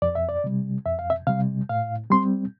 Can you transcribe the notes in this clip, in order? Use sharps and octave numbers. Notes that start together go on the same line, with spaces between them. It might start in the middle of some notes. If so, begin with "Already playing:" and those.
F2 D5
E5
D5
C3 G3
F2 E5
F5
E5
C3 G3 F5
A2 F5
G3 C4 C6